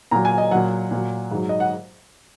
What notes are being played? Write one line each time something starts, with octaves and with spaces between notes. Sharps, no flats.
A#2 F#3 A#5
G#5
D#5
A#2 F#3 F#5
A#2 F#3
G#2 F#3
D#5
F#5